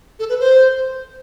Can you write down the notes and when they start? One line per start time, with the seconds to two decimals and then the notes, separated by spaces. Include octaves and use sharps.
0.20 A4
0.29 B4
0.40 C5